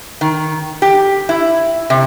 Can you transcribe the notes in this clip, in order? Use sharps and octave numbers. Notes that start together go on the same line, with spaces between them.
D#3
G4
E4
C3